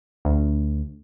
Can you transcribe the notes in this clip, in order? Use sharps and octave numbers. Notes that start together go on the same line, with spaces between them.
D2